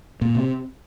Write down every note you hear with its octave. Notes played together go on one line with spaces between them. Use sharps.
A#2
C3